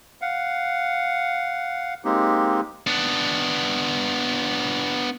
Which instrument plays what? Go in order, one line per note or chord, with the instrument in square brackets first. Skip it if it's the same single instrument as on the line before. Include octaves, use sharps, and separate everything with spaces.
[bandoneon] F5 F#5
G#3 A#3 C4 D#4 G4
[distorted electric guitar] B3 D4